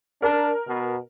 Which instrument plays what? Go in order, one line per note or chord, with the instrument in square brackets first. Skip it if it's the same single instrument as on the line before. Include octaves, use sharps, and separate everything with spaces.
[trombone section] D4 [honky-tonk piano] A#4
[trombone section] B2